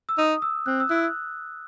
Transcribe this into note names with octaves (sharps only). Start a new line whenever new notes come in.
E6
D#4 D#6
E6
C4 F#6
E6
E4 F#6